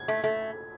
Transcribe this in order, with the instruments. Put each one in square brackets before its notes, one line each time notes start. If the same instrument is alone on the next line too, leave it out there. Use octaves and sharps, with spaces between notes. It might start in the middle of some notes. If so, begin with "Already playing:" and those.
Already playing: [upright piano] G#6
[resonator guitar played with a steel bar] A3
A3